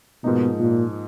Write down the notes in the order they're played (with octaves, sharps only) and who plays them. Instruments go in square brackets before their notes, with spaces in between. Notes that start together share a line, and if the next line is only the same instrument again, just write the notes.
[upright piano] G#2 F3 A#3 D#4 [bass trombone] B2
[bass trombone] A#2